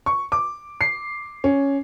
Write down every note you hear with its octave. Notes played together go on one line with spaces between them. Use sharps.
C#6
D6
C7
C#4